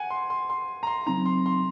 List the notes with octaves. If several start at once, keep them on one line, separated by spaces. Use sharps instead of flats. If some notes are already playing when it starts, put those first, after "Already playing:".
Already playing: F#5 G#5
C6
C6
C6
A#5
C6
C#3 F#3 C4 D#4 A#5
C6
C6